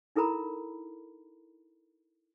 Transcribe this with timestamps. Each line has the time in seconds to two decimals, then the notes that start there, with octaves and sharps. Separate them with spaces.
0.16 D#4 E4 A4 A#4 A#5 B5